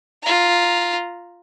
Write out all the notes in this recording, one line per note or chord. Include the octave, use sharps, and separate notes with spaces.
F4 A#5